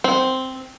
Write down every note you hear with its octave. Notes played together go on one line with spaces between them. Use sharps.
C4